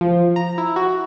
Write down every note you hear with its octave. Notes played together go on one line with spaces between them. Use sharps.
F3
A#5
E4
F#4